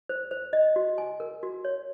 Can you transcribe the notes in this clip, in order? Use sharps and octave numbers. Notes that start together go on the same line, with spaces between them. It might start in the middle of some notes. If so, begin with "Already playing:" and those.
C5
C5
D#5
F#4
G#5
A#4
F#4
C#5